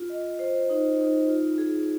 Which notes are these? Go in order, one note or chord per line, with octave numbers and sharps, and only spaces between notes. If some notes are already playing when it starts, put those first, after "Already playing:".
Already playing: F4
D#5
C5
D#4
D#4
F4
G#4